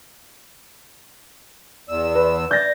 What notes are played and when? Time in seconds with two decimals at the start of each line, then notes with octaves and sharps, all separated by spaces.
1.89 E2 D5 E6
2.15 B4
2.51 D5 G6 A6 A#6